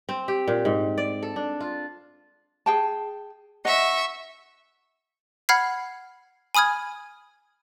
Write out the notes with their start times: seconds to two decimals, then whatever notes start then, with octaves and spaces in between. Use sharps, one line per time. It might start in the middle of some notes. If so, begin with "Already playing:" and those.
0.09 C4
0.28 G4
0.48 A#2
0.65 G#2
0.98 D5
1.23 A4
1.36 D4
1.61 F4
2.66 G#4 G5 A5
3.65 D#5 E5 F#5 C#6
5.49 F#5 B5 F6 G#6 C7
6.55 G#5 B5 D#6 F6 G#6